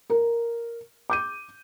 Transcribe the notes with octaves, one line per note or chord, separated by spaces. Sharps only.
A#4
D6 G6 D#7